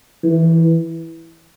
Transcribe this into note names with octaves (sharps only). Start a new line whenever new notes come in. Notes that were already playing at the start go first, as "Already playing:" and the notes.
E3